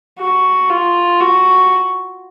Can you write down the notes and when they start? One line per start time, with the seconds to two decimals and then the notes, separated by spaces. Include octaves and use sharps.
0.19 F#4
0.70 F4
1.20 F#4